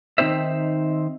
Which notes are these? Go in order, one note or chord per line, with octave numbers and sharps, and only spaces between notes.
D#3 E3 C4 D#4 C5 E5